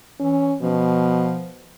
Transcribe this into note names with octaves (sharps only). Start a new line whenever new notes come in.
E3 C#4
B2 F3